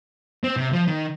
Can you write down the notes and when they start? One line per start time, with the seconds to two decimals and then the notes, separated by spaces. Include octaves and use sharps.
0.44 C4
0.57 C3
0.73 F3
0.88 D#3